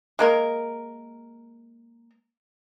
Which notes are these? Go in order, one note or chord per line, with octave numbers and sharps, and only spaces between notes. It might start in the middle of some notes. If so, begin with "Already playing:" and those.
G#3 A#3 A#4